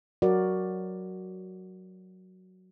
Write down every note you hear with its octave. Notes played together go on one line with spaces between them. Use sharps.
F#3 F#4 A#4 D5